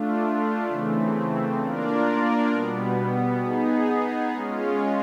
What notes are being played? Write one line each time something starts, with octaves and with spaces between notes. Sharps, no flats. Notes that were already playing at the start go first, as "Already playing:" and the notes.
Already playing: A3 D4 F4
C#3 E3 A3 C4
A#3 D4 F4 A#4 D5
B2 G3 B3
B3 D#4 G#4
G#3 C#4 F4